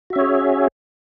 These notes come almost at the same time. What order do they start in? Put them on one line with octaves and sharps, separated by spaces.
F#4 E5 C#4 C#5 G#4